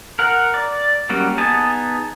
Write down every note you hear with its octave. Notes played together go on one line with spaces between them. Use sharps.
A#4 F#5
D5
F#3 G3 A#3 C#4 F#4
B3 D#4 G#4 G#5 A5